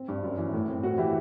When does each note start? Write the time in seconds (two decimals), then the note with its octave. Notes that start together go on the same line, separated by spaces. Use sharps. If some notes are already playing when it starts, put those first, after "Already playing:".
Already playing: C4
0.08 G2
0.23 F#2
0.37 E3
0.53 A2
0.68 C4
0.83 A2 F#4
0.98 E3 E4 G4